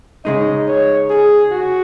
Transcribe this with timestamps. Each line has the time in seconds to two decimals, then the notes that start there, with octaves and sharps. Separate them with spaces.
0.24 C#3 G#3 D#4 D#5
0.68 C#5
1.10 G#4
1.52 F#4